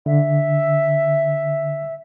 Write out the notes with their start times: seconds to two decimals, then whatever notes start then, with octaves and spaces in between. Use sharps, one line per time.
0.06 D3 E5